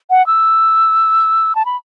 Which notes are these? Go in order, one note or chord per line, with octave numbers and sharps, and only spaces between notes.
F#5
E6
A5
B5